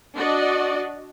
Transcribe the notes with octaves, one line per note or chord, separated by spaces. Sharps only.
D4 F#4 D5 D#5